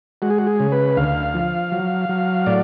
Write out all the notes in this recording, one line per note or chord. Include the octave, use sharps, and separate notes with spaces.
G#3 F#4
G#4
F#4
G#4
C#3
B4
D2 F5
F3
F#3
F#3
A2 D5